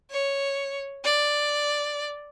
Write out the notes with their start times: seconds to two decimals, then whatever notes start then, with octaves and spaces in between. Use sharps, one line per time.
0.11 C#5
1.04 D5